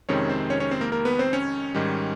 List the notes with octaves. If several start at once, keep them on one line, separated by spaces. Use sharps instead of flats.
F2 C3 D#3 G#3 C4 C#4 C#5
C4 C5
C#4 C#5
C#4 C#5
C4 C5
A#3 A#4
A#3 A#4
B3 B4
C4 C5
C#4 C#5
G#2 D#3 G3